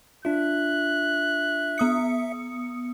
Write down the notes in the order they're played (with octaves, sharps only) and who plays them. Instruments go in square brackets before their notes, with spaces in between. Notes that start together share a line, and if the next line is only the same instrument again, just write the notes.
[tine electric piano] D4 F4 [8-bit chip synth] E5 [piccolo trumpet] F#6
[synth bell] B3 D#6 C#7